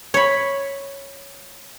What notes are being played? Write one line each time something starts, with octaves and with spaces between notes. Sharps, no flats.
C#5 B5